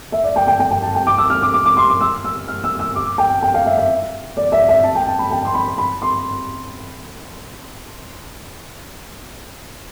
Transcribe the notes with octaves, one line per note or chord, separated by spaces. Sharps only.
E5
D5
G5
G5
G5
G5
A5
G5
D6
E6
F6
D6
D6
D6
C6
D6
E6
E6
F6
E6
E6
D6
G5
G5
F5
E5
E5
D5
E5
E5
A5
G5
A5
B5
G5
C6
B5
B5
C6